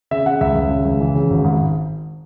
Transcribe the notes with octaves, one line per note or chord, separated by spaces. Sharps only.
C#3 E5
C#3 F#5
C#2 E5
C#2
C#3
C#2
E3
C#3
G#1
G#2